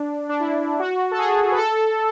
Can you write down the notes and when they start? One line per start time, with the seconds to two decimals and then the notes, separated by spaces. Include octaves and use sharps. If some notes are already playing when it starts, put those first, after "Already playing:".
Already playing: D4
0.29 D4
0.40 E4
0.79 F#4
1.11 A4
1.19 G#4
1.52 B4
1.57 A4